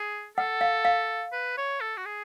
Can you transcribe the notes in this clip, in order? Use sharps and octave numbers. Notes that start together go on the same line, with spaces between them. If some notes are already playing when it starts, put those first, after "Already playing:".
Already playing: G#4
A4 F#5
F5
F5
B4
C#5
A4
F#4
G#4